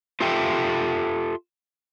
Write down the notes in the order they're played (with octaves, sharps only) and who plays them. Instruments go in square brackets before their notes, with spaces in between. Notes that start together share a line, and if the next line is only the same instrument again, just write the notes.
[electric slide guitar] F4 G4 A4 E5 G5